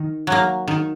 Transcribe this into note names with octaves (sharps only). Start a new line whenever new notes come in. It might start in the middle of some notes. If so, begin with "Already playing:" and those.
Already playing: D#3
F#3 A#3
D#3